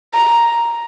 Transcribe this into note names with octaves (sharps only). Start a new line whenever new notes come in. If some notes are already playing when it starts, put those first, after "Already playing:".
A#5